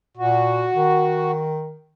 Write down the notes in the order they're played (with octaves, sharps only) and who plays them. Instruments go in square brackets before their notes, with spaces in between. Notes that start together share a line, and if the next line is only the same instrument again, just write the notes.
[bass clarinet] A#2 [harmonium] F#4
[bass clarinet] D#3